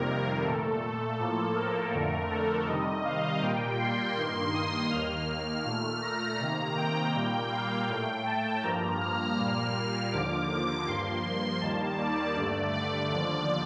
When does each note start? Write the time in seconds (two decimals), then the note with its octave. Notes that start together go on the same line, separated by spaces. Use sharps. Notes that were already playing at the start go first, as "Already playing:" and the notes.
Already playing: F2 C3 D#3 G3 A#3 A#4
0.44 A#2 A3 A4
0.81 A4
1.18 A2 F3 A#3
1.55 A#4
1.93 F2 D3 A3
2.30 A4
2.67 C3 D#3 G3 D#5
3.04 F5
3.42 A#2 G3 A#3 G5
3.79 C6
4.16 G2 D#3 A#3
4.53 D#6
4.91 D#2 D#3 A#3 F6
5.28 F6
5.65 A#2 A3 F6
6.02 A#5
6.39 C3 D#3 A#3
6.77 G5
7.14 A#2 G3 A#3
7.51 F5
7.88 A2 A3 G5
8.26 A5
8.63 G2 F3 A#3 A#5
9.00 F6
9.38 A#2 G3 A#3
10.11 D#2 D3 F3 A#3 D6
10.87 G2 F3 A#3 C6
11.61 D#2 D#3 G3 A#3 A5
11.98 D5
12.36 G2 D3 A3
12.73 D5
13.10 D#2 D3 F3